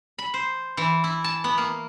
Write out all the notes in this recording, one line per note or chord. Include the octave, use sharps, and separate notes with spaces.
B5
C5
E3
E4
A5
B3
A#3